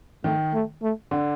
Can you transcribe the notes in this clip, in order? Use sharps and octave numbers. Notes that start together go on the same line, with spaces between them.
D#3 A3
A3
A3
D3